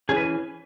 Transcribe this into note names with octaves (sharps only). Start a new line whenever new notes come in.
E3 C#4 G#4
B4